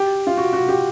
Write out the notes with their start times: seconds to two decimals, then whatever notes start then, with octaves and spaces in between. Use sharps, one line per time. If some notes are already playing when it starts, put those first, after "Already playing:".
Already playing: G4
0.27 F4
0.37 F#4
0.53 F#4
0.68 G4